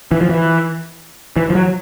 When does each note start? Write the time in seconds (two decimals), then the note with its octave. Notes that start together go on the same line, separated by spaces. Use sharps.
0.12 E3
0.21 F3
0.29 E3
1.36 E3
1.50 F3
1.55 F#3